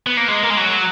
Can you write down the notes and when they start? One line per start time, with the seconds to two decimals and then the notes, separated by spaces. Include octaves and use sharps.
0.07 B3
0.17 A#3
0.28 G#3
0.43 A#3
0.50 G#3
0.57 F#3